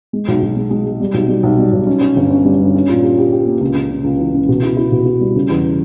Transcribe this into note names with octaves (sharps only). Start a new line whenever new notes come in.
G#3
B1
B1
G#3
G#3
G#3
G3
B1
G3
B1
G3
B1
C#4
C#4
G1
C#4
G3
G2
C#4
A#2
G4
G4
G4
A#3
C#2
C#3
C#3
C#2
E3
C#3
B2
E4
E4
B2
E4
G3
C#3
E2